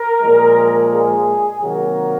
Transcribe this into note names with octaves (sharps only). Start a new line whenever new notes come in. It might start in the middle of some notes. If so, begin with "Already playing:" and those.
Already playing: A#4
A#2 F3 G#3
G#4
C3 D#3 F#3 A#3 A#4